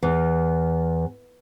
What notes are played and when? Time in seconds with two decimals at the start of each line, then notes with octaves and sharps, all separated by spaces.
0.03 E2